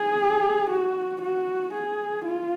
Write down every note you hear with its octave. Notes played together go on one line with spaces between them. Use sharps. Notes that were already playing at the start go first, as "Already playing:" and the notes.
Already playing: G#4
F#4
F#4
G#4
F4